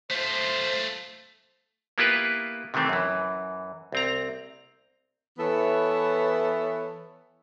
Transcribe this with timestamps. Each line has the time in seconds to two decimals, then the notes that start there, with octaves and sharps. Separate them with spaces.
0.11 A3 F4 C5
1.98 A#3 B3 E4 F4 G4 B4
2.74 C3 D#3 E3 A3 C4
2.89 F#2 E3
3.92 C2 C4 A#5
5.39 E3 B3 E4 A4 C#5